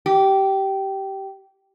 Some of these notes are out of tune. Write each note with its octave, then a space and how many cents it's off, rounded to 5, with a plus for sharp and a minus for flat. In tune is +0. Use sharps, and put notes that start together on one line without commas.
G4 -15